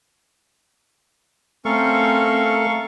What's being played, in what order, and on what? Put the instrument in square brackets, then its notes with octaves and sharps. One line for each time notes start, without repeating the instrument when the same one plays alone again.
[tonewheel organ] A3 [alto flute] C4 [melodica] C#4 A#4 [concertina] A4 F5 C#6